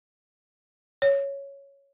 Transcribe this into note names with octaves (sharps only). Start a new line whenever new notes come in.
C#5